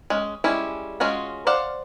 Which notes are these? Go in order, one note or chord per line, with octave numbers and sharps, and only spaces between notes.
G#3 C#4
G3 G#3 C#4 E4
G#3 C#4 F4 F#4
C5 D5 F5 F#5